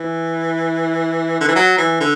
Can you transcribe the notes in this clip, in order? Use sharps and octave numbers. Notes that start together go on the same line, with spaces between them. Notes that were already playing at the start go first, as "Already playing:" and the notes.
Already playing: E3
D3
E3
F#3
E3
D3